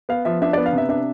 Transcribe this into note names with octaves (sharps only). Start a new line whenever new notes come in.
B3 F5
F3 E5
D4 E5
D5
B3
F5
C3 E5
D4 E5